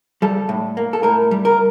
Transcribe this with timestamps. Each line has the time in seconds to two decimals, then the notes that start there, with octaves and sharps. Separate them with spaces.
0.22 G3 A4
0.49 A2
0.77 A#3
0.93 A4
1.03 A2 A#4
1.31 G3
1.45 A#4